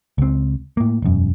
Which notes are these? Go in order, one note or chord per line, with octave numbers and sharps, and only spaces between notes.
C#2 C4
A2 A#3
E1 F#2